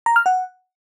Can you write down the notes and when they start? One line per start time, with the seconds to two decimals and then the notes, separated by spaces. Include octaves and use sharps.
0.06 A#5
0.16 F6
0.26 F#5